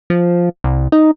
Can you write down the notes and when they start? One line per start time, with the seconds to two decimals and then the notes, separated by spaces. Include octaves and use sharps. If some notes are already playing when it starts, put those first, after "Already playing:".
0.10 F3
0.64 C2
0.92 D#4